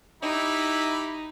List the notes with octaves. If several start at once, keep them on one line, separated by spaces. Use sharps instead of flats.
D#4 E4 G4 B5